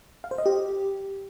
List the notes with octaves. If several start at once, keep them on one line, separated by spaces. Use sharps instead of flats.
F5
C5
D#5
G4